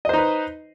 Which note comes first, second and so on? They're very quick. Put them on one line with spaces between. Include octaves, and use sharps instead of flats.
D#5 C5 D#4 B4